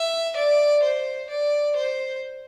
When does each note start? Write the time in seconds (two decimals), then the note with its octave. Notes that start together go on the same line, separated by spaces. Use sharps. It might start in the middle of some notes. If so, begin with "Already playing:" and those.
Already playing: E5
0.36 D5
0.82 C5
1.30 D5
1.76 C5